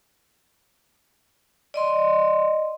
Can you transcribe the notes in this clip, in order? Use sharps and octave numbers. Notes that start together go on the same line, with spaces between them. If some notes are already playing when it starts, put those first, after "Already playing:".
D5 D#5 C6